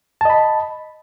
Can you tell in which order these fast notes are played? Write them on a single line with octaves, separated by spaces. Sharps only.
A5 D#5 B5